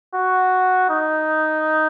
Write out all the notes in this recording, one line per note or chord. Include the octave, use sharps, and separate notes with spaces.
F#4
D#4